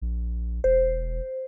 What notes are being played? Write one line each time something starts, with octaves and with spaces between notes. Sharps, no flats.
A#1
E1 C5